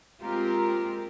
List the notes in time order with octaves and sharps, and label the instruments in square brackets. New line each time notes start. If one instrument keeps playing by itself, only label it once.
[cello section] G#3 A#3 C4 F4 G4 A#4